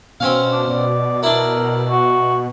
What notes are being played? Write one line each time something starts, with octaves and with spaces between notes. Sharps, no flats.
B2 C4 C#4 F5
D4
B2 D5
D4 E4 A#4
F#4